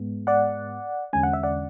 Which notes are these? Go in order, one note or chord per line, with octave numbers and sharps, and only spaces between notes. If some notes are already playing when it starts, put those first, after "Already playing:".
Already playing: G#2 G#3 B3
D5 F#5
E2 D3 G#3 C#4 G#5
F#5
E5
D5 F#5